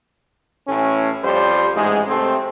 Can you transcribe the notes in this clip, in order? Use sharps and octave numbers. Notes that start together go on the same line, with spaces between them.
A1 A2 C#4
F2 G3 G4 C5
A1 G#2 G#3
C3 A3 C4